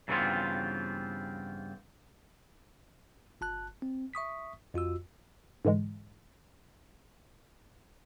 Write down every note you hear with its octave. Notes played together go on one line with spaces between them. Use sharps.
G2 C#3 E3 B3 C4 F4
G1 A5 F#6
C4
E5 C#6 D#6 B6
F2 F4 F#4 E6
G#2 D3 E3 G#3